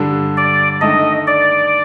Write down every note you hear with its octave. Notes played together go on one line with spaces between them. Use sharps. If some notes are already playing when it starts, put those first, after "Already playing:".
Already playing: G2 D3 G3 D4
D5
D#3 A3 D4 A4 D#5
D5